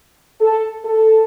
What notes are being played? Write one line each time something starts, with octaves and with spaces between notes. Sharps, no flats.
A4
A4